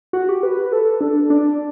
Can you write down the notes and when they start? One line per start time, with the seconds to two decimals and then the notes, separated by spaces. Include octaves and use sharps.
0.13 F#4
0.29 G4
0.43 B4
0.72 A4
1.01 D4
1.30 D4